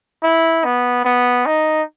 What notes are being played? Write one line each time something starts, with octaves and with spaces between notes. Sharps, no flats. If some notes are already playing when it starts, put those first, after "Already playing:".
E4
B3
B3
D#4